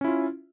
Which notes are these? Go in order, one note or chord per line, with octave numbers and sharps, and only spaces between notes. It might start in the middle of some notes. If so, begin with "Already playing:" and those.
C#4 E4 F4